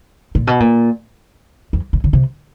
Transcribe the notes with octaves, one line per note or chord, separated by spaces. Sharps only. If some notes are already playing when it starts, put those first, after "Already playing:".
A#2
B2
A#2
F2
B2
C#3
C3